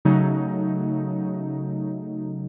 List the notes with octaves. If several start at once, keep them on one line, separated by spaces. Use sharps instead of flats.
C#3 F#3 A3 D#4